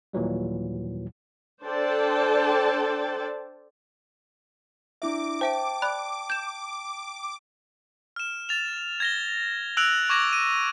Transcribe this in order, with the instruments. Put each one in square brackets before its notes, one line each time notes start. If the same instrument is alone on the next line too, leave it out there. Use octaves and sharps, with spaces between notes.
[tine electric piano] D#2 A#2 E3 F#3 G3
[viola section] D4 A4 C5 D5 G5 A5
[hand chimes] D4 E4 E5 [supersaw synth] D6
[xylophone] C5 E5 D7 [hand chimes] G5 A5
[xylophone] D5 B5 F#6
G6 E7
[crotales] F6 E7
A6 F7
G#6 A#6 G7
E6 F#6 D7 F7 F#7
C#6 D6 G#6 A#6
D#7